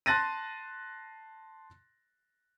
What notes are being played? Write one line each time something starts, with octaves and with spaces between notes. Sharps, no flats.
A5 C6 F#6 A6 A#6 D#7